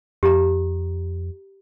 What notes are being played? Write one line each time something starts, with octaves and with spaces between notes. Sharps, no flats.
F2 G4 A#5